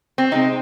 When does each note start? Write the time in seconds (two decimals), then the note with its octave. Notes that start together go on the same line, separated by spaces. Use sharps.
0.18 C4
0.31 C3 G#3 C4 D#4